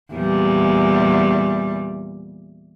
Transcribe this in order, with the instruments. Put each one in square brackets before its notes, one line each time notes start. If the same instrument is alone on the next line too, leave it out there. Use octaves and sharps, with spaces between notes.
[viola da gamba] E2 A#2 G3